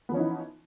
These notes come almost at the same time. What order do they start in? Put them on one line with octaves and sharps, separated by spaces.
B3 F3 C#4 D#4 E3